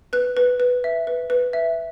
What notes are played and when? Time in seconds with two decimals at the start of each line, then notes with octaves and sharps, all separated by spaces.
0.13 B4 F#6
0.37 B4
0.60 B4
0.84 E5
1.07 B4
1.30 B4
1.53 E5